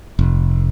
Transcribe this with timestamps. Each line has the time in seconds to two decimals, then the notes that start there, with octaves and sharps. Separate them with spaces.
0.19 F1